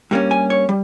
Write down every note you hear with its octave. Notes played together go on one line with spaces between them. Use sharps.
G2 G3 A#3 C#4
G#5
C#5
G3